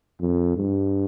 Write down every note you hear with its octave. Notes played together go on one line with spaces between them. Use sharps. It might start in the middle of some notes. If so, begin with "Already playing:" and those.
F2
G2